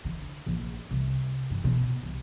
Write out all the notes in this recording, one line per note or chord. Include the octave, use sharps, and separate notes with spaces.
D3
A#1
C2
G2
B2
C2